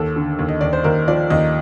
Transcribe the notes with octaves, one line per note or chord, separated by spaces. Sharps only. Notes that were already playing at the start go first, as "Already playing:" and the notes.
Already playing: D#2 A4
D3
D#2
D#5
D#2 D5
C5
D#2 A#4
F3 D5
D#2 D#5